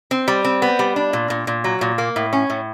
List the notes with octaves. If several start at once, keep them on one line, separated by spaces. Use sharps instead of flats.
C4
G3
C4
B3
G3
D4
A#2
A#2
A#2
F#3
A#2
A#3
A2
C#4
A2